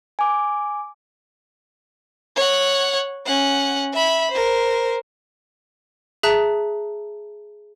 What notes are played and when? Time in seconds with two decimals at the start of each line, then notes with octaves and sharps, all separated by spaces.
0.19 G#5 D6
2.36 C#5 F#5
3.26 C#4 F#5
3.93 E5 B5
4.31 A#4 C5
6.23 G#4 E5 A5 A#5 F#6